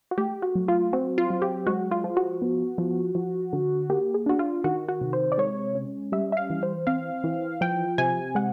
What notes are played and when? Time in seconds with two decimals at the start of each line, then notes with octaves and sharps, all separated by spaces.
0.11 F#4
0.18 A3 G4
0.42 F#4
0.55 F#3
0.68 F4
0.93 C4 F#4
1.18 F4
1.30 F#3
1.42 G4
1.67 G#3 F#4
1.91 F4
2.04 F3
2.17 F#4
2.42 B3
2.78 F3
3.15 F3
3.53 D3
3.90 A#3 G4
4.14 G#4
4.26 D4 F#4
4.39 F4
4.64 D#3 F#4
4.88 F#4
5.01 C3
5.13 C5
5.32 D5
5.38 G#3 C#5
5.75 C#4
6.12 G3 E5
6.32 E5
6.37 F5
6.50 E3
6.63 C5
6.87 C4 F5
7.24 E3
7.61 F3 G5
7.98 C3 G#5
8.35 G#3 F#5